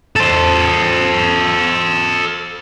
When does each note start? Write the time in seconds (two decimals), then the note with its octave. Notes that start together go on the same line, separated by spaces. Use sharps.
0.16 A4 C5